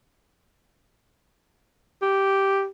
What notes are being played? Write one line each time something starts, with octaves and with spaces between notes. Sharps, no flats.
G4